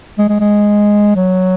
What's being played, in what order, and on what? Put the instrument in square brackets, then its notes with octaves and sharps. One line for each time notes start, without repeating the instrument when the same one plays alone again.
[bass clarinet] G#3
G#3
G#3
F#3